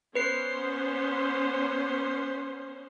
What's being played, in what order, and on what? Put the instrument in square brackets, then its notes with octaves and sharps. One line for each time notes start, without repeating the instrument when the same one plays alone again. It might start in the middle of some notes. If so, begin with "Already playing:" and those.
[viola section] B3 C#4 C5 [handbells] B4 C7